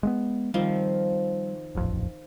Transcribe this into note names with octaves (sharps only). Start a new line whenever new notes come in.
G#3 A#3 B3
D#3 F3 G3 C4
D#1 A1 F2